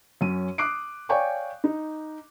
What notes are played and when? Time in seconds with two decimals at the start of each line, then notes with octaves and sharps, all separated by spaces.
0.21 F#2 C#4 D#7
0.58 D6 D#6 F#6 C7 D7
1.09 C#5 D5 F5 G5 G#5 C#6
1.64 D#4